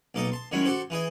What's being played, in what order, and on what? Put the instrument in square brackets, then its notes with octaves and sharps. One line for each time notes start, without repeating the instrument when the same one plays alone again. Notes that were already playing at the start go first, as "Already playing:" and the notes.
[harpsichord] B1 A#3 A4 D#5
A5 C6
D#3 F#3 G#3 C#4 E4
F#4 G4 A4 C5
E3 E4 G#4 D#5